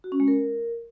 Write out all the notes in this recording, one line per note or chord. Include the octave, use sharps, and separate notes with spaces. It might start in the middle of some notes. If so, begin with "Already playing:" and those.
F#4
C#4
G#3
A#4